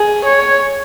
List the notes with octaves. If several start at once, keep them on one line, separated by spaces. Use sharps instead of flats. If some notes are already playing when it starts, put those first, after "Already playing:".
Already playing: G#4
C#5